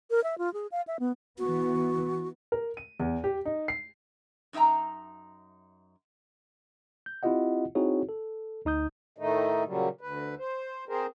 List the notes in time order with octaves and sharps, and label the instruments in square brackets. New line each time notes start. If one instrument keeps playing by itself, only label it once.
[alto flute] A#4
E5
F4
G#4
F5
E5
B3
[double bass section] E3 B3 [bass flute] F#4
[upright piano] A#4
D#7
E2
G4
D#4
C7
[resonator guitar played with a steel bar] F#2 D#4 E5 G5 A#5
[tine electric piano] G6
C4 E4 F4 G4 D#5 F#5
C4 D#4 E4 F#4 G#4 C#5
A4
D2 D#4 D#6 G6
[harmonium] A2 D#3 A3 D#4
A#2 C#3 F#3 G3
D2 B4
C5
C4 G#4 A#4 C5